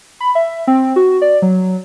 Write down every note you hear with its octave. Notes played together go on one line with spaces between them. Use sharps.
B5
E5
C4
F#4
D5
F#3